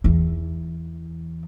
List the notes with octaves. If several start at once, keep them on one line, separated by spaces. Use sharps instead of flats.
E2 E3